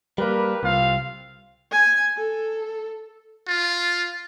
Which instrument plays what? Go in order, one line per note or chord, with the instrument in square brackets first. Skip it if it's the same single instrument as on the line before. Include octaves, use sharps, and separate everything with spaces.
[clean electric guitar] G3 A#3 [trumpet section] G4 A#4 B4
[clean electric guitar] C2 [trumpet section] C4 F4 F5
[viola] G#5
A4
[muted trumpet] F4